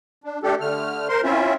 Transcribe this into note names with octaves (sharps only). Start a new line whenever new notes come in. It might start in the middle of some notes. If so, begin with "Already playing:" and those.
D4
A3 D4 G4 A4
D3 A3 F6
A#4 C5 C6
C4 C#4 E4 F4 E5